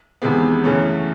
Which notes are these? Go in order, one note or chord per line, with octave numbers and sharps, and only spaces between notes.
E2 C3 D#3 G#3 B3
F#2 C#3 E3 A3 C#4